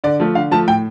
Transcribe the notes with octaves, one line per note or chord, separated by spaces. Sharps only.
D3 D5
F3 A3
D3 F5
F3 A3 A5
A2 G5